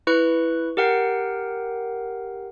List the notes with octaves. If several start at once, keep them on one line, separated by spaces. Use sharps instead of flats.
E4 B4 C#6 F#6
G4 A#4 F#5 G5 C7